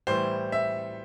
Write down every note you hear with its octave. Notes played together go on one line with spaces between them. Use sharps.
A2 E3 G3 C5
E5